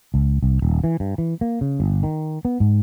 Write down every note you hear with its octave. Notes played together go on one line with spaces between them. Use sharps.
C#2
C2
D#1
E3
G2
E3
A#3
C#3
G1
D#3
B3
G#2